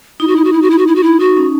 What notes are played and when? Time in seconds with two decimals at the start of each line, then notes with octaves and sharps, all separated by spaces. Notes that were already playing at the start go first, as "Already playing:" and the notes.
0.20 D#4 E4
0.27 F#4
0.36 E4
0.44 F#4
0.53 E4
0.62 F#4
0.70 E4
0.78 F#4
0.87 E4
0.96 F#4
1.03 E4
1.20 D#4 F#4
1.37 C#4